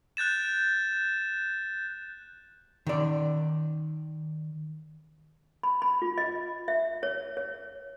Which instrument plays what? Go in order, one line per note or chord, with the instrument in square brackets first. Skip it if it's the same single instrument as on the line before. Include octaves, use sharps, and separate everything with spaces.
[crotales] F#6 G6 A6 E7
[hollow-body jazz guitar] D#3 D5
[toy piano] B5
B5
F4
D#5
E5
C#5
C#5